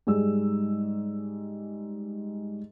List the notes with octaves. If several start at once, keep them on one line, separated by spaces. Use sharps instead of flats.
G#2 G3 G#4 E6